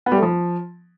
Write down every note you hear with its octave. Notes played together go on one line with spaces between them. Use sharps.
B3
G3
A3
F3